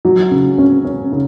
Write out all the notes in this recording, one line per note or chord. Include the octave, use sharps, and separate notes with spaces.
F#3
C#3
C#4
C#4
C#3